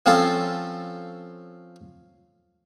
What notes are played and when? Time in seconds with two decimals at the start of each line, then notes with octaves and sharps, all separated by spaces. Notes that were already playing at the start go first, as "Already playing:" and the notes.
0.06 F3 C4 C#4 F4 A4